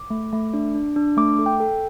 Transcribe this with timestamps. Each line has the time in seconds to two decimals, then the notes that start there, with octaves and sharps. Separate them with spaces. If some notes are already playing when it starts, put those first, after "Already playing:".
Already playing: D6
0.10 A3
0.33 A3
0.54 D4
0.75 D4
0.96 D4
1.17 A3 D6
1.39 A4
1.46 G5
1.60 A4